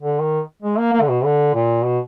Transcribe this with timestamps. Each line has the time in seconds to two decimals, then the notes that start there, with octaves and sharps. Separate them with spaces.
0.01 D3
0.22 D#3
0.63 G#3
0.78 A#3
0.93 A#3
1.01 D3
1.08 B2
1.24 D3
1.55 A#2
1.85 B2